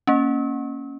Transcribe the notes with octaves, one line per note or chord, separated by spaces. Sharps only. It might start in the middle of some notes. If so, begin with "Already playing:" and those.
A#3 C#4